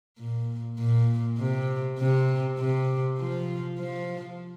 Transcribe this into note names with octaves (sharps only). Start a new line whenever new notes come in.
A#2
A#2
C3
C3
C3
F3
F3